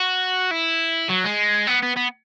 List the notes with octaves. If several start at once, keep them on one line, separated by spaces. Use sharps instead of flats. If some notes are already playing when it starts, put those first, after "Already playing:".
Already playing: F#4
E4
F#3
G#3
B3
B3
B3